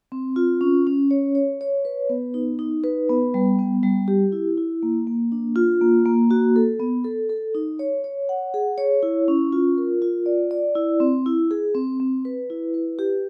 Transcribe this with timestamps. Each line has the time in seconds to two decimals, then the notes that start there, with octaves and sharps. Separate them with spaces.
0.12 C4
0.36 F4
0.61 C#4
0.87 C#4
1.11 C#5
1.35 C#5
1.61 C#5
1.85 B4
2.09 B3
2.34 D#4
2.59 D#4
2.84 B4
3.09 B3
3.34 G3
3.59 B3
3.83 G3
4.08 G4
4.32 E4
4.57 E4
4.83 A#3
5.07 A#3
5.32 D4
5.56 F4
5.81 A#3
6.05 A#3
6.31 F#4
6.56 A4
6.79 B3
7.04 A4
7.29 A4
7.55 D#4
7.79 C#5
8.04 C#5
8.29 F#5
8.54 G#4
8.78 C#5
9.03 E4
9.28 C#4
9.53 F4
9.78 A#4
10.02 F4
10.26 D5
10.51 D5
10.75 E4
11.00 C4
11.26 E4
11.51 G#4
11.75 C4
12.00 C4
12.25 B4
12.50 E4
12.74 B4
12.99 G4